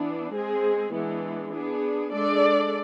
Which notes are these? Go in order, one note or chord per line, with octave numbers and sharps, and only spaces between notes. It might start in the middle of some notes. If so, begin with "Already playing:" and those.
Already playing: E3 B3 D4
G#3 C4 G#4
E3 G#3 B3 D4
B3 D4 G#4
G#3 D4 A4 D5